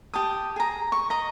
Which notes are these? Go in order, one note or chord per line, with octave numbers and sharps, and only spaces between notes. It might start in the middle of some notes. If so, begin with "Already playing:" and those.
G4 A5 D#6
G#4 A#5
C#6
D#5 A#5